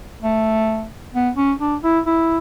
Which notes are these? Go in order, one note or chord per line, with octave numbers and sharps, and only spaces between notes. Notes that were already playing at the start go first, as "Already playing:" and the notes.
A3
B3
C#4
D4
E4
E4